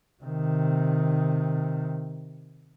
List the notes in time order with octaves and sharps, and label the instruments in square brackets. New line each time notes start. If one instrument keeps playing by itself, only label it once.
[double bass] C3 D#3